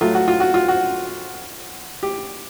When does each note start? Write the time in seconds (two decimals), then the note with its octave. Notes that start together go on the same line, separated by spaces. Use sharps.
0.01 A2 F#3 A3 F4
0.15 F#4
0.28 F4
0.40 F#4
0.54 F4
0.68 F#4
2.03 G4